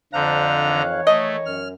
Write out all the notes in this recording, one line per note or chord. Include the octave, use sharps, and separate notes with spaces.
F2 D3 D4 C5 F5 A#5 F#6
D#3 E3 C#5
A3 D#5
F#2 F6